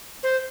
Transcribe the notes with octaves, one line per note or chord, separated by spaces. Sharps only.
C5